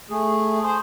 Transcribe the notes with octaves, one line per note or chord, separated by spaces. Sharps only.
A3 G#4
G#4 C5